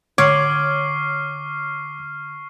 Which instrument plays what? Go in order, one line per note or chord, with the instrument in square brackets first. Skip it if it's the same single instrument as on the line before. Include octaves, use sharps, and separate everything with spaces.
[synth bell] D3 F#7 [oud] C#5 [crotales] C#6 F6 C7 [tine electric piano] D6